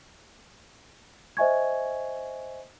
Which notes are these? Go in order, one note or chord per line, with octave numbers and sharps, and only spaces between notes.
C5 D#5 E5 G#5 C#6 G#6